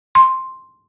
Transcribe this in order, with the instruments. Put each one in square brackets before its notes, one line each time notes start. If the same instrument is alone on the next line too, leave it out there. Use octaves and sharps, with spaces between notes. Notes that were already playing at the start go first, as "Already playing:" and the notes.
[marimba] C6